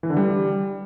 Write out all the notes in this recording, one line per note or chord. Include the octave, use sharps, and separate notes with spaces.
E3
D3
G3